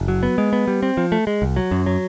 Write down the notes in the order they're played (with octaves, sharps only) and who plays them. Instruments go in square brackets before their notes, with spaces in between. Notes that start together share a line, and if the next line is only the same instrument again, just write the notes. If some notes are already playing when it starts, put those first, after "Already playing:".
Already playing: [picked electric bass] F#1
F#3
B3
G#3
B3
G3
C4
F3
A3
G#3
C2
F#3
F#2
F#3